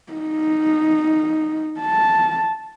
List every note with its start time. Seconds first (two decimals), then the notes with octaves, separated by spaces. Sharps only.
0.13 D#4
1.80 A5